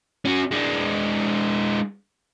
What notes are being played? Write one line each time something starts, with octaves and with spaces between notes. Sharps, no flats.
C#4 F#4
G#3 D4